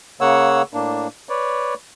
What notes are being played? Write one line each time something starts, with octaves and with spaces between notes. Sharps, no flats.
C#3 A#3 C#5 F#5 E6
A2 A#3 D4
B4 C#5 D5